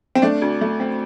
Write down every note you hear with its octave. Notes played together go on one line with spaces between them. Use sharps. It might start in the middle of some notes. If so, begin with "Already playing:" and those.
C4
A3 D4
D2
A3
C4